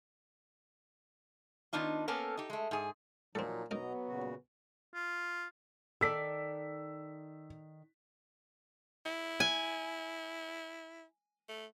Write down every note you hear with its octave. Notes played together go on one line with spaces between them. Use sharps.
D#3 B3 D4 D#4 F4
A#3 B3 C#4 A4 A#4
D#4 G4
G#3 A3
G#2 G#4
A#2 F3 F#3 C4 D#4 A4
B2 F#3 B3 D#4 A#4 D#5 A#5
A#2 C#3 F#4
F4
D#3 A4 D5 E6 B6
E4
G#5
A3